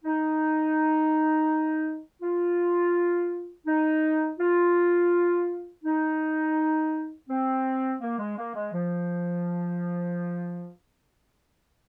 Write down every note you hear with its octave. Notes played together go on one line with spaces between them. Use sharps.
D#4
F4
D#4
F4
D#4
C4
A#3
G#3
A#3
G#3
F3